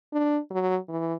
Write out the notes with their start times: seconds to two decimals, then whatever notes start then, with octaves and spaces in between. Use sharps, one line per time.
0.12 D4
0.51 F#3
0.89 E3